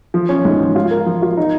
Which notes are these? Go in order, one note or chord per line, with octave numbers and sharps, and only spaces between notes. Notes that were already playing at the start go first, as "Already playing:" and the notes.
F3
C#4
G#2
F3
F4
A#4
F3
F4
D#4